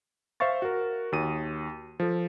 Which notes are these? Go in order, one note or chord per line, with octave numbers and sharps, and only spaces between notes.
C5 E5 F5 C#6 A6
F#4 A#4
D#2 F#4 D#6 D#7
F3 A4